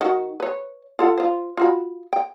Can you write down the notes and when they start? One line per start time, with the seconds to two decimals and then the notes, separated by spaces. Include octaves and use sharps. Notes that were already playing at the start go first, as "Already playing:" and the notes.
0.01 D#3 F#4
0.40 B4 C#5
0.99 F4 A4 F#5
1.18 F4 C5
1.57 F4 F#4 B5
2.13 G5